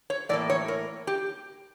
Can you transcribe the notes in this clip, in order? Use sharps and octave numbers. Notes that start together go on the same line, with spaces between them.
C#5
A2 E3 A#3 D5
C#5
A#4
G4